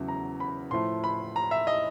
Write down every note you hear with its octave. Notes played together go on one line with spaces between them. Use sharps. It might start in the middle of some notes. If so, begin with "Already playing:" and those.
Already playing: E2 C#3 F#3 A3
A#5
B5
A2 F3 A3 C6
B5
A#5
E5
D#5